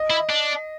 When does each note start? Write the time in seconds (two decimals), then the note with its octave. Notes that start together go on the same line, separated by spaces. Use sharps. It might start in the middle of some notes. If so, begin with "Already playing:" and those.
Already playing: D#5
0.10 E4
0.29 D4